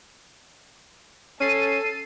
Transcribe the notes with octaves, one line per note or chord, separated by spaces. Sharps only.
C#4 A4 A6 C7 D#7